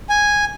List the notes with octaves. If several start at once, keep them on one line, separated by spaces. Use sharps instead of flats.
G#5